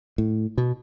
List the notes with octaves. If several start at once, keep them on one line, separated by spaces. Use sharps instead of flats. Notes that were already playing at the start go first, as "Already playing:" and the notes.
A2
B2